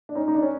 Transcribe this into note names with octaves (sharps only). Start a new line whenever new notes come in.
D4
C#4 D#4
D#4
D4
C#4